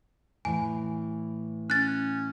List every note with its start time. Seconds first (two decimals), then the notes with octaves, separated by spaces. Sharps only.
0.45 A2 E3 G#5
1.70 C#4 F#6 A6